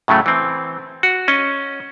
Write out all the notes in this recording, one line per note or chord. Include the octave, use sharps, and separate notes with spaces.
A2 C#3 F#3 A3
E3 C4
F#4
C#4 D#5